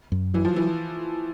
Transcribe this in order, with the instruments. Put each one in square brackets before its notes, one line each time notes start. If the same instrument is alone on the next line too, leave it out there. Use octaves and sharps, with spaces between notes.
[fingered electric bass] F#2
[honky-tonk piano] E3 [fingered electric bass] F#3
[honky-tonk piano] F3
E3